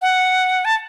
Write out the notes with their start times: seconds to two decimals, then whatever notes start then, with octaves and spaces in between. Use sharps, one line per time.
0.02 F#5
0.65 A5